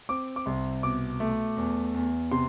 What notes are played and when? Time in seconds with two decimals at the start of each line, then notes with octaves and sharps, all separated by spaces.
0.09 C4 D6
0.36 D6
0.46 C2 C6
0.83 B2 D6
1.20 A3
1.57 E2
1.94 E2
2.31 C3 C6